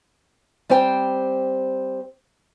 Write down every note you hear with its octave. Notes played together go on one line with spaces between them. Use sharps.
G3 C4 C5 G5